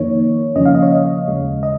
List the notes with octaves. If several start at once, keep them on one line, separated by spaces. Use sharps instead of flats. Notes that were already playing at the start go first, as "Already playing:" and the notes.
Already playing: F2 D#3 A#3 D#4 C#5
F2 C#3 F3 A#3 C#4 D#5
F5
D#5
C#5
D#5
D#2 C#3 G#3
D#5